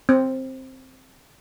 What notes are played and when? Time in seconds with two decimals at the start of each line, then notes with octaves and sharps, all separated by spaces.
0.09 C4